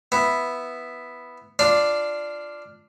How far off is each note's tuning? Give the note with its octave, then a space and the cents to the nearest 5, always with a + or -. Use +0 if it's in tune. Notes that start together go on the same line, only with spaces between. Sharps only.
B3 +0 E4 +0
D4 +0 F4 -5 D5 +0